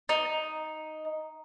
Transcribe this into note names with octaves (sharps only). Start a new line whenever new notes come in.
D#4